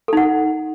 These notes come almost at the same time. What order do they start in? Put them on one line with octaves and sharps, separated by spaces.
A4 D#4 F#5